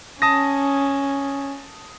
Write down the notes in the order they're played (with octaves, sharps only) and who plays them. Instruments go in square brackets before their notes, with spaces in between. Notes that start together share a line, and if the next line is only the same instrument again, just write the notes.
[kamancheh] C#4 [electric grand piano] A5 D#6 A#6